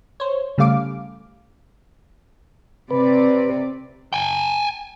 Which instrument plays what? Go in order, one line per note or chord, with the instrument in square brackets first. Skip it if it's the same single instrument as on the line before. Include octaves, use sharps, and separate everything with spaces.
[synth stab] C5 C#5
C#3 G3 A3 F5 D6
[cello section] C3 D5 [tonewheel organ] B4
[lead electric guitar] G5 G#5